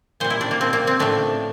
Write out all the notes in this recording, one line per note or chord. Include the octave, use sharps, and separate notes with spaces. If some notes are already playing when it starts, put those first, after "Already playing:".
A#2 G3 C5
E4
D4
A#3
C4
A#3
C4
A2 F3 A3 D4